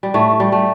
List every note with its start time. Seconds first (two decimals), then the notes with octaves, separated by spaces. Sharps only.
0.03 G3
0.14 A2 A3
0.40 G3
0.52 A3